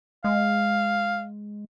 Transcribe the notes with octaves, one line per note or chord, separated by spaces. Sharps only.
G#3 F5